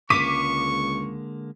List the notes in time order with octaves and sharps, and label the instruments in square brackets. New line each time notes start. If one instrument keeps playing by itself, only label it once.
[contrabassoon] C#2 [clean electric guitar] D3 G#3 A#3 [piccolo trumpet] C#6 [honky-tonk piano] D6 B6 D#7